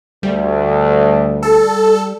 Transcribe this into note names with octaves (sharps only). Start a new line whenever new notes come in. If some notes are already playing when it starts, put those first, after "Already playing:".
D2 G3
A4